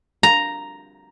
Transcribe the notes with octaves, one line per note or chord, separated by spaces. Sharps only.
A#5